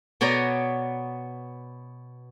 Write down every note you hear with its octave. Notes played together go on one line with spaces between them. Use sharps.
B2 B3 C#5 D5 A#5